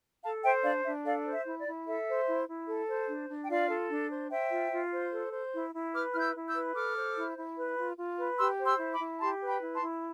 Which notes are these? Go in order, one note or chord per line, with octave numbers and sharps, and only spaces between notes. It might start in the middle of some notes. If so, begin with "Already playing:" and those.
A4 F5 A5
C5 E5 G5
D4 D5 F5
D4 E5
A4 D5 F5
C5
E5
E4
D5
E4
A4 E5
C5
E4
E4
A4
C5
D4
D4
G5
F4 D5 F5
A4
D4
C5
C5 E5 G5
F4
F4
C5
A4
C5
E4
E4
B4 D6 F6
E4 F6
E6 G6
E4
E6 G6
B4
A4 D6 F6
C5
E4
E4
B4
F4
F4
B4
G4 C6 E6
C5
C6 E6
E4
B5 D6
E4
G4 A5 C6
B4
G5 B5
E4
A5 C6
E4